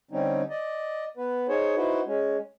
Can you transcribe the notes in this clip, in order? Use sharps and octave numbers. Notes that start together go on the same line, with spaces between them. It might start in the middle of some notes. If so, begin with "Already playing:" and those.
D3 G3 C4 C#4 D#4
D5 D#5
B3 B4
D#4 G#4 C5 C#5
D#4 E4 F#4 B4 C5
G#3 C#4